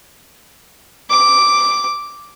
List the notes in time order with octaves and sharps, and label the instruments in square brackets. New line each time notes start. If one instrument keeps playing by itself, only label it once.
[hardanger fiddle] D6